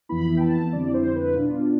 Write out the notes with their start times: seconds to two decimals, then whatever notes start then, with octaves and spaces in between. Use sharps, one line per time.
0.09 F2 E3 B3 E4 B5
0.37 G5
0.40 A5
0.72 F2 D3 G3 C4 E4 D5
0.94 C5
1.15 B4
1.36 B2 B3 D4 F4